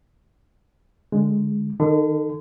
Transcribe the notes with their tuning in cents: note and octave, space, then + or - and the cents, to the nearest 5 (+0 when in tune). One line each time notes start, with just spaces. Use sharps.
D3 +0 G#3 +0
D#3 -20 A4 +10 C6 -45